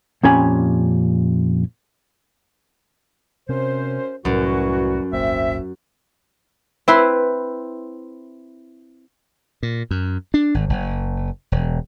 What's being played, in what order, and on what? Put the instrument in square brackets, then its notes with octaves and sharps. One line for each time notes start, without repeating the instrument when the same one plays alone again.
[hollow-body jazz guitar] F2 A#2 C#4 G4 G#5 B5
[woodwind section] F#2 C#4 C5 [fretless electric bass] C3 C4
[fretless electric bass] C2 A2 [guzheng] F#2 [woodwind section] E3 G3 F#4
[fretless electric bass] D#1 G#1 A#3 [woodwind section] C4 C#4 E5
[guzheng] C4 E4 B4 C6
[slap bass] A#2
F#2
D4
G#1
F#1
E1